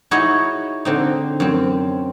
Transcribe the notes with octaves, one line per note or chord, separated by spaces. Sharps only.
D#4 E4 F#4 G#4 C#5 D#5
D3 C4 D#4
F#2 C4